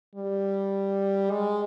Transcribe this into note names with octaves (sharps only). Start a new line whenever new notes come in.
G3
G#3